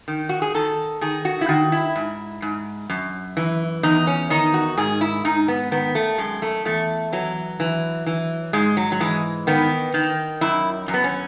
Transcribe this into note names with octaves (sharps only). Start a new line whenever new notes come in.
D#3
F#4
G#4
D#3 A4
D#3 G#4
F#4
E4
D#3 F#4
E4
G#2
G#2
F#2
E3
E2 D#4
C#4
D#3 D#4
F#4
G#2 G#4
E4
G#2 D#4
B3
D#3 B3
A3
F#2 G#3
A3
E2 A3
E3 F#3
E3
E3
G#2 G#3
F#3
F#3
E3 G#3
D#3 B3
D#3
F#2 E4
F#2
B3
C#4